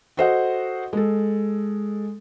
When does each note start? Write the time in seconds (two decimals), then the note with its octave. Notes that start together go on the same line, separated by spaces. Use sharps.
0.17 F#4 A4 C5 D#5 F#5
0.93 G#3 A4